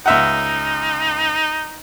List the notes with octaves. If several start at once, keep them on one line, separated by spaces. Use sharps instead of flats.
C#2 D#4 E5 F#5